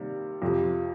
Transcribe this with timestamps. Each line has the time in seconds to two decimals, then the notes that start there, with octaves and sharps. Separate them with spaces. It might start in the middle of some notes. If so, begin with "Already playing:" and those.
Already playing: C3 D#3 G3 A#3
0.42 F2 C3 F3